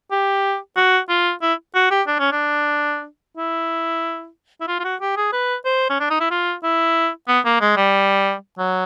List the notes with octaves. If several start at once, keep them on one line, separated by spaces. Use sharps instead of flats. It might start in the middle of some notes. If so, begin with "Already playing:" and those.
G4
F#4
F4
E4
F#4
G4
D4
C#4
D4
E4
E4
F4
F4
F#4
G4
G#4
B4
C5
C#4
D4
D#4
E4
F4
E4
B3
A#3
G#3
G3
F#3